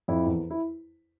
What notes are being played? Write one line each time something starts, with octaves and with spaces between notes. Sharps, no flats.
F2 E4
E2
E4